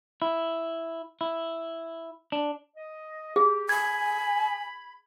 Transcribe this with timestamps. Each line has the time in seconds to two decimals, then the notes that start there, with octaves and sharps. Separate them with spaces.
0.22 E4
1.21 E4
2.32 D4
2.77 D#5
3.36 G4 G#4
3.69 G#5 B5 G#6